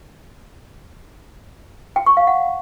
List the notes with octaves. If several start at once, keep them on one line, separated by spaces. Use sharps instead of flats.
G5
C#6
F5
F#5